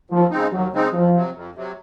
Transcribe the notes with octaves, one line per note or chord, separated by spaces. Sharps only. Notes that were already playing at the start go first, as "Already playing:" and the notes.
D#2 F3
C#3 G#3 C4 D#4
D#2 F#3
C#3 G#3 C4 D#4
F2 F3
C3 F#3
F2
C3 F#3